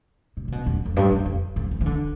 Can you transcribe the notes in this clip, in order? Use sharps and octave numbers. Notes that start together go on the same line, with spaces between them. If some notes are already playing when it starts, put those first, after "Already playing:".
C3
C3
B2
E2
F2
G2
E2
F2
F2
E2
E3
D3